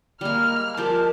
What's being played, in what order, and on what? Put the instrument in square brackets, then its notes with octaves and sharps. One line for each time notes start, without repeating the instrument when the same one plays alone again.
[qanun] G3 G#3 [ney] A#3 [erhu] F6
[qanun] F3 G#3 G4 [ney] A#4 [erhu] A5